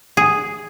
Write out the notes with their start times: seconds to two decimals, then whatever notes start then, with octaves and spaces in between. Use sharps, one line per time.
0.17 G#4